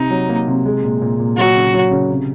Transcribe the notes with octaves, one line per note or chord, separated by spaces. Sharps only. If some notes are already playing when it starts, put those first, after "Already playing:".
Already playing: C3 D#4
F#3
A#3
C3
G#3
A#2
A#2
A#2
F#3 F#4
C#3
F#3
C#3
C3